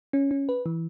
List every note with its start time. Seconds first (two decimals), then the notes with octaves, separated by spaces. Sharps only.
0.13 C#4
0.31 C#4
0.49 B4
0.66 E3